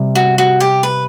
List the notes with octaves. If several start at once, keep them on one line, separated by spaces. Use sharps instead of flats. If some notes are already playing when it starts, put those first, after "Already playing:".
Already playing: C3 G3 C4
F#4
F#4
G4
B4